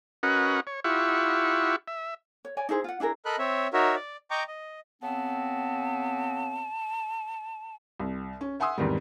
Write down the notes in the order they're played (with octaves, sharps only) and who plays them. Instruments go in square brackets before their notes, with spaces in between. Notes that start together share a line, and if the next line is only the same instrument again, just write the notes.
[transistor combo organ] C#4 F#4 A#4 B4 D#5 F#5
C#5
E4 F4 G4 E5 F#5 C#6
E5
[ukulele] C#5
C#5 D5 G#5
D#4 E4 G#4 C5
F4 F#5
D4 E4 G#4 A#4
[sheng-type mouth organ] A4 A#4 D#5 B5 F#6
C4 C#5 E5
D#4 F#4 A#4 C#5 E5
D5
D#5 G5 A#5 C#6 D6
D#5
[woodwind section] C#3 B3 C4 [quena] A5
[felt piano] C2
C#4
E5 F#5 G#5 C6 D#6 E6
E2 G#2 C3 D#3 G3